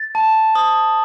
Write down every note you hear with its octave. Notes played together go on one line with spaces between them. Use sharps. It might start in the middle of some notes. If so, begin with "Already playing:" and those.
Already playing: A6
A5
D#6